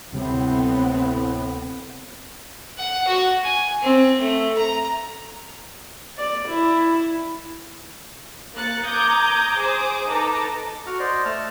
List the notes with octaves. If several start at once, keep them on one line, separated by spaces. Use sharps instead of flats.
D2 A2 C3 G3 B3 C4
F#5
F#4
G#5
C4
A3
A#5
D5
E4
A#3 F#6 A6 C#7
A#5 D6 D#6 G6 G#6
G#4 C5 D6 D#6
D#4 A4 B4 A5 A#5 D6
F#4 F#5 F6
C5 D5 D#5
A3 A5 F6